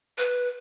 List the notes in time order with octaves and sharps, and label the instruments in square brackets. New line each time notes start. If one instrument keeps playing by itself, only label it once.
[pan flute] B4